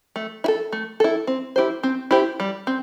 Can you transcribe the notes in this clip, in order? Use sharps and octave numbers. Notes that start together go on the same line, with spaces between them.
A3
E4
A4
A3
E4 A4
C4
E4 G4 C5
C4
E4 G4 C5
G3
C4